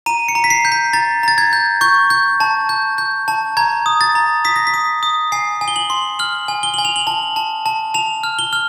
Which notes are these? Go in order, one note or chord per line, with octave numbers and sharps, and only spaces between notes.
A#5 D#7
C#7
A#5
B6
C7
G6
B6
A#5 A6
A#5 A6
G#6
G6
C#6 G6
G6
A5
G6
G6
A5
A#5 G#6
D#6
A6
A#5
D#6 B6
A#6
B6
D#6
D#6
G#5 C7
G#5
G7
F#7
C6
F6 F#7
G#5
G7
G#5 F#7
F7
F#7
A5 F#7
A5
A5
A5 F7
F6
G7
F6